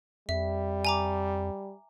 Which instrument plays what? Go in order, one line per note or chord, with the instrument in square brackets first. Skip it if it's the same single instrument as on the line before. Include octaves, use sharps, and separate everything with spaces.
[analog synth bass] F2 [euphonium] G3 [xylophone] E5
[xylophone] G#5 A#5 D6